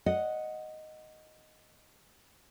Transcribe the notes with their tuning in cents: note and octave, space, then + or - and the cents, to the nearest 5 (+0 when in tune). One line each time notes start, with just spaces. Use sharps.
D#5 +0 F#5 +0